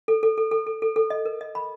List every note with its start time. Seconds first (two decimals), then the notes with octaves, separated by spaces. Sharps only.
0.08 A4
0.23 A4
0.37 A4
0.51 A4
0.67 A4
0.82 A4
0.96 A4
1.10 D#5
1.25 A#4
1.41 D#5
1.55 B5